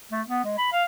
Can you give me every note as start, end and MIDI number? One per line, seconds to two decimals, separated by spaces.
0.12 0.22 57
0.29 0.43 59
0.44 0.53 56
0.58 0.69 83
0.72 0.84 77